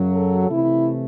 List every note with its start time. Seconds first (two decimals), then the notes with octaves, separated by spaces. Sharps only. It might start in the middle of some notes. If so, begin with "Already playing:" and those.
Already playing: F#2 C#3 F#3
0.14 A4
0.49 C3 E3 A3 E4